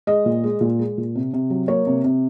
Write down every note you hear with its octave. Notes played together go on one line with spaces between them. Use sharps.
G#3 D#5
A#2
G#3
A#2
G#3
A#2
C3
C3
F#3
A#3 C#5
C3
C3